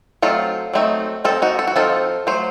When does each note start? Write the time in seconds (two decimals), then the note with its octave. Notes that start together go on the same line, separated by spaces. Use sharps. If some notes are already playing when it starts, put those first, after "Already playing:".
0.22 F#3 A3 C4 D#4 F4 A4
0.74 F#3 A3 C4 D#4
1.24 F3 C4 D#4 F4 A4
1.42 D#4 F#4
1.59 A4
1.67 F#4
1.76 F3 C4 D#4 F4 A4
2.27 F#3 A3 C5